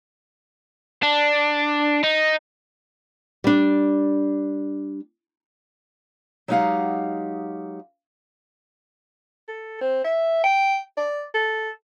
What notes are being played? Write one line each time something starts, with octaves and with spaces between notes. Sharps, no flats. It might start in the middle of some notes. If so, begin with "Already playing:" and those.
D4
D#4
G3 D4
F#3 G#3 D#4 G4 F5 F#5
A4
C4
E5
G5
D5
A4